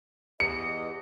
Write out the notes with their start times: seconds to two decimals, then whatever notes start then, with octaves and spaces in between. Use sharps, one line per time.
0.40 E2 G4 D#5 C#7